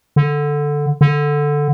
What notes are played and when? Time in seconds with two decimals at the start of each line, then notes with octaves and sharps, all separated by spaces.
0.16 D3
1.01 D3